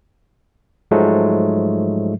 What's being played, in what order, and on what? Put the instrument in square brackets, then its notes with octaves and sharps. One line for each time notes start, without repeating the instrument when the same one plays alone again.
[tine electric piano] G#2 F3 F#3 G#3 A3